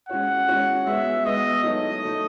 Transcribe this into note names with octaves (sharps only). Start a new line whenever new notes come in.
G#3 C#4 F#4 C#5 F#5
G#3 C#4 F#4 C#5
G#3 B3 F#4 E5
G#3 B3 F#4 D#5
F#3 A3 D#4 A4 C#5 D#5
F#3 A3 D#4 A4 C#5